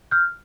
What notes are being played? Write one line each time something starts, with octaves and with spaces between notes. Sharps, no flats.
F6 G6